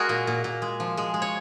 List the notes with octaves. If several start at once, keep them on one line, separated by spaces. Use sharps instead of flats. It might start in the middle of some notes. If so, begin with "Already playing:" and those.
Already playing: G#3 F#4 G#4 A#4
A#2
A#2
A#2
G#3
F3
G#3
G#3
C#5